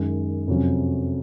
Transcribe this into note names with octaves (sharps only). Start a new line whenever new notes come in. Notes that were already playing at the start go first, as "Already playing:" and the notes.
Already playing: F#2 D#3 G#3
F2 C3 F#3 C#4